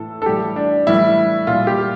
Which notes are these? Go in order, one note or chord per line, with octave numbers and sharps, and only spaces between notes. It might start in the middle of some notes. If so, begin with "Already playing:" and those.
Already playing: A2 E3 A3 A4
A4
A2 E3 G3 G4
D4
A2 E3 G3 E4
A#2 G3 F4
G4